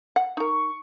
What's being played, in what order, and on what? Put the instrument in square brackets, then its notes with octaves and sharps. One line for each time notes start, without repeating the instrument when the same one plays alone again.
[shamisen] F#5
[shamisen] D#4 A#4 [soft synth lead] C#6